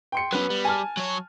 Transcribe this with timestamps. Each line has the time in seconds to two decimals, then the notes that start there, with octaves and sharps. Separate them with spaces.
0.12 G5 C6 C#7
0.33 F#3 B3 C#4 B4
0.50 G3
0.65 G#5 A5 F6
0.97 F#3 C#5